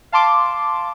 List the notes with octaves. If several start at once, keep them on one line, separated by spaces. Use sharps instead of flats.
F5 A5 C6 D6